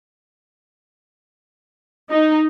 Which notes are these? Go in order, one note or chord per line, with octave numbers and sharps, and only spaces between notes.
D#4